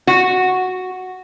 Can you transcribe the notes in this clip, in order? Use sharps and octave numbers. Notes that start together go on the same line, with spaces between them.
F#4